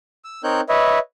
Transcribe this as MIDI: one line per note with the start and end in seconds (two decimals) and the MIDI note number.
0.24 0.42 88
0.44 0.61 60
0.44 0.61 63
0.44 0.61 70
0.44 0.61 73
0.44 0.61 90
0.44 0.61 91
0.69 0.99 71
0.69 0.99 73
0.69 0.99 75
0.69 0.99 76